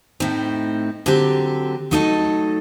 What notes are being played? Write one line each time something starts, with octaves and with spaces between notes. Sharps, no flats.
A2 A3 C4 D#4
D3 F#3 C4 G4
F#3 A3 D#4 A4 D#5